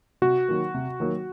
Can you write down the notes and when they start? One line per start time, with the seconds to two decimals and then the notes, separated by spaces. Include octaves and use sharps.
0.22 C3 F#4
0.48 D#3 F#3 A#3
0.74 C3
1.00 D#3 F#3 A#3